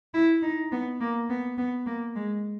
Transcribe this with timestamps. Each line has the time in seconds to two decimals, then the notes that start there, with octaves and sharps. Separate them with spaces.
0.14 E4
0.43 D#4
0.72 B3
1.01 A#3
1.30 B3
1.58 B3
1.87 A#3
2.16 G#3